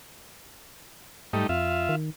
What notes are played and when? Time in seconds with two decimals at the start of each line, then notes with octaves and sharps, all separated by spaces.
1.33 G#2 G3 A3 D#4
1.49 F2 F4 E5
1.89 D#3